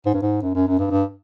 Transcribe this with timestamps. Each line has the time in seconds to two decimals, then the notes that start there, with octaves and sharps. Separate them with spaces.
0.06 G#2
0.14 G2
0.22 G#2
0.42 F#2
0.55 F#2
0.67 F#2
0.79 G2
0.91 G2